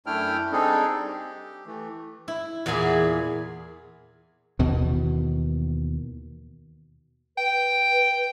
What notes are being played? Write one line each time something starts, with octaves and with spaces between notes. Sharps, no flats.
F#2 A3 D4 E4 G5 F6
G3 C4 D4 D#4 G#4 A4
G4
E3 A3
E4
E2 A#2 G#4 G#5 B5
D#2 B2 D#3 E3
B4 G5